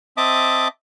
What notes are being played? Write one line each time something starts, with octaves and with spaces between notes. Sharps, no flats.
C4 D#5 E5 A5 D6 D#6